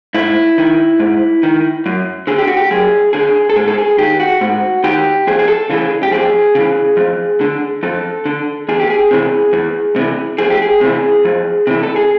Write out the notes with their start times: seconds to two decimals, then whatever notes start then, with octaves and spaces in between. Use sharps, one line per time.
0.14 G#2 E4
0.58 D#3
1.00 G#2
1.43 D#3
1.86 F#2
2.27 D3 G#4
2.38 G4
2.48 F#4
2.57 G4
2.71 F#2 G#4
3.13 D3 G#4
3.50 A4
3.56 G#2 G#4
3.68 A4
3.78 G#4
3.98 D#3 G4
4.20 F#4
4.41 G#2 F#4
4.84 D#3 G4
5.27 F2 G#4
5.39 G#4
5.48 A4
5.70 C#3 E3 G#4
6.03 G4
6.11 F2 G#4
6.55 C#3 E3
6.97 F2
7.41 D3
7.83 F2 A4
8.25 D3
8.69 E2 G#4
8.80 G4
8.90 G#4
9.11 C3 E3
9.53 E2
9.96 C3 E3
10.38 F2 G#4
10.50 G4
10.62 G#4
10.81 C3 E3
11.25 F2
11.67 C3 E3
11.83 A4
11.96 G#4